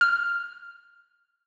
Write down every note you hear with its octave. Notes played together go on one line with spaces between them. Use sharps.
F6